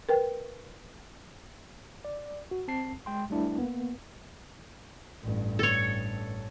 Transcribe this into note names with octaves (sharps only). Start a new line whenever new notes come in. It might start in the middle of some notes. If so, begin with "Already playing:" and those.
A#4 B4 G5
D5
F#4
C4 A5 C7
G#3 G5 C6
G3 A3 D4 E4
A#3 B3
A1 G2
A4 C#5